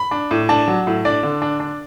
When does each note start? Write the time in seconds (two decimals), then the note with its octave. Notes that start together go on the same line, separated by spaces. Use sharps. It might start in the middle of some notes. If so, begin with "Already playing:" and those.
Already playing: B5
0.11 D4
0.31 A2
0.49 D4 A5
0.68 F#3
0.87 A2
1.05 D4 D5
1.23 D3
1.42 D4
1.60 D4